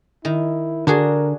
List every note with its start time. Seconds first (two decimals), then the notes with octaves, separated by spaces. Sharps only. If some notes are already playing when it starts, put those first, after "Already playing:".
0.25 D#3 E4
0.87 D3 D4 F#4 G#4 A#4